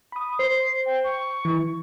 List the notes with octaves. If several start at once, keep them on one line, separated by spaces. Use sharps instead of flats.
B5 D#6
C5 C7
G5
C#6
E3